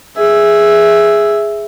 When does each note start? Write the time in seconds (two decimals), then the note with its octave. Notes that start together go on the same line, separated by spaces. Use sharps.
0.17 G#4 E5